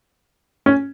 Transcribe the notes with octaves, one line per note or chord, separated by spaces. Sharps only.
C#4